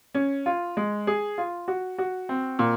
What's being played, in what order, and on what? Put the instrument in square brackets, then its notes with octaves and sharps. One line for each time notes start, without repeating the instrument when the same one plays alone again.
[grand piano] C#4
F4
G#3
G#4
F4
F#4
F#4
C4
A#2